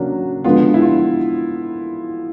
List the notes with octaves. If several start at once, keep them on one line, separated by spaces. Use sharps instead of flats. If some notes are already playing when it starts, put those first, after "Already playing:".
Already playing: C#3 F#3 A#3 D4 F#4
D3 F3 G#3 B3 F4
E4
F4